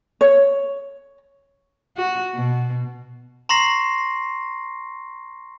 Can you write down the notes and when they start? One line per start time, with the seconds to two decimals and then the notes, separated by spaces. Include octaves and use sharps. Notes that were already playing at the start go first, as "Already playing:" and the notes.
0.21 C#5
1.97 F#4
2.35 B2
3.49 A#5 C6 C#6 A#6 C7